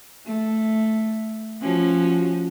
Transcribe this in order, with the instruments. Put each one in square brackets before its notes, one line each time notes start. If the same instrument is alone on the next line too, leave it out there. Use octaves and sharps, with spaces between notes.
[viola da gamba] A3
F3 C#4 F#4